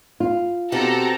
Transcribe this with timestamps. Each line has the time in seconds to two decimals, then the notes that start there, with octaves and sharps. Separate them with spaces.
0.20 F4
0.72 B2 C4 F#4 G4 A4 A#5